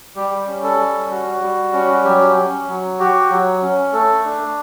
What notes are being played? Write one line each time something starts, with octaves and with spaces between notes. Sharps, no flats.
G3 G4
C#4
A4
G3
F#4
G3
C#4
F#3 G4
C#4
F#3
F#4 G4
F#3
C#4
A3 A4
D4